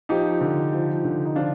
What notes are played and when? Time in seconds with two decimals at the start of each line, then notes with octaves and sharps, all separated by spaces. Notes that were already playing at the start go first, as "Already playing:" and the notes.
0.09 F3 D#4 G4
0.41 D3
0.73 F3
1.05 D3
1.25 D#4
1.35 F3 D4 F4